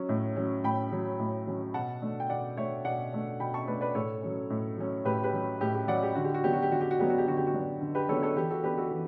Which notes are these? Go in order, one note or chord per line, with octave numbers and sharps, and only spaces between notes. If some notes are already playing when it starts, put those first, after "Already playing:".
Already playing: F#3 C#4
A2
F#3 C#4
A2 G5 B5
F#3 C#4
A2
F#3 C#4
B2 F#5 A5
A3 D4
G5
B2 D5 F#5
A3 D4 C#5 E5
B2 D5 F#5
A3 D4
B2 G5 B5
A5 C#6
A3 D4 B4 D5
B4 D5
A2 A4 C#5
F#3 C#4
A2
F#3 C#4
A2 G4 B4
G4 B4
F#3 C#4
A2 G4
G4
F#3 C#4 D5 F#5
G4
D3 F#4
G4
F#4
F#3 B3 D4 G4
F#4
G4
D3 F#4
G4
F#4
F#3 B3 D4 G4
F#4
G4
D3 F#4
G4
F#4
F#3 B3 D4
D3
G4 B4
F#3 B3 D4 A4 C#5
A4 C#5
E3 G4 B4
F#4 A4
B3 D4 G4 B4
F#4 A4
E3